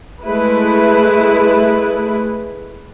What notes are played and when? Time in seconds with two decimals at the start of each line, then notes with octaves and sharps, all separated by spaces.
0.23 G#3 A3 E4 B4